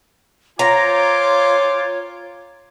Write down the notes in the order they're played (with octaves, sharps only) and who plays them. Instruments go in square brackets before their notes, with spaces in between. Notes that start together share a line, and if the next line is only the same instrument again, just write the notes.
[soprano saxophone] F4 [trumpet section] C5 G#5 D6 [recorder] C#5 [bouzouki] A#5